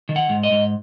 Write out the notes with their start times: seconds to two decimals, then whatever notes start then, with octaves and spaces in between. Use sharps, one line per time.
0.09 D#3
0.16 F#5
0.29 G#2
0.43 D#5
0.51 G#2